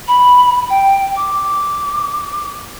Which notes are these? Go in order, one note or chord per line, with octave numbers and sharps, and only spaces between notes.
B5
G5
D6